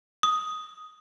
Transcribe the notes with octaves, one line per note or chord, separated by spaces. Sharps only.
D#6